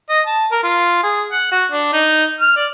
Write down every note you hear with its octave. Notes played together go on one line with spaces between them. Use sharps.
D#5
A5
A#4
F4
G#4
F#5
F#4
D4
D#4
F6
D5